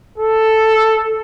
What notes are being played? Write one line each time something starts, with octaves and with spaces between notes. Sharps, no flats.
A4